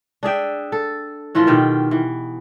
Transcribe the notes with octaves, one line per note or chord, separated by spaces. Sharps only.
D4 G#4 E5 G5
A4
A2 E3 F3 F4
B2 D#3 G4
E3